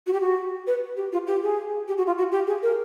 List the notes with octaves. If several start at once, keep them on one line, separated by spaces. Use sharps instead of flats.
F#4
G4
F#4
B4
G4
F4
G4
G#4
G4
F#4
F4
F#4
G4
G#4
A#4